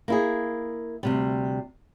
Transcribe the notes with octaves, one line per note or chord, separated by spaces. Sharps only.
A#3 E4 G#4
D2 C3 G3